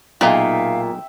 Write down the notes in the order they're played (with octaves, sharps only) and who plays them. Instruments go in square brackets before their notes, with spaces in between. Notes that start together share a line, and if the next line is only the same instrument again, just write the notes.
[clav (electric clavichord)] B1 D#4 G#4 [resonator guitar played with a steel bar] A#2 [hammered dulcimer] E5 G5 [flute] F5